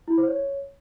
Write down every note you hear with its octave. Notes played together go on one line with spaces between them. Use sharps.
E4
C5
C#5